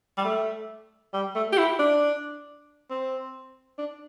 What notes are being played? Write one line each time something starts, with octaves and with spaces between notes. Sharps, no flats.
G3
A3
G3
A3
G4
E4
D4
C4
D4